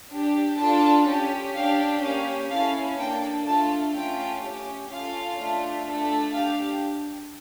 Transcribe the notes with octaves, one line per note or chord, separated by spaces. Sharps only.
D4 G4
D4 F4 A4 A5
C#4 G4
D4 G4 F5
A#3 C#4 G4 F5
C#4 E4 A4 F5
A#3 D4 A4 G5
A3 D4 F4 A4 A5
A3 C#4 F4 G5
C#4 G4
C#4 F4 A4 F5
A3 D4 F4
A3 D4 A4
D4 G4 F5